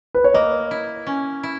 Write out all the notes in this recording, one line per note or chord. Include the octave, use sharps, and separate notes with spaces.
B4
C#5
A#3 D#5
E4
C#4
E4